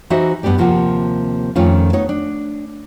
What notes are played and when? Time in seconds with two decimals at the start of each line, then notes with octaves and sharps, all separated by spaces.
0.10 E3 D#4 F#4 C5 D#5 E5
0.43 G2 B3 D4 G4 D5
0.58 D#2 C3 F3 A#3 F4 F#5
1.56 F2 D#3 A3 C#4 F4
1.93 B3 D#4 C#5
2.09 D4